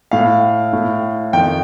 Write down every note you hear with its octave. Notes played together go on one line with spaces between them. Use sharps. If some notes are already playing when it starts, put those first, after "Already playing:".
A2 F5
A2
F2 D#3 G5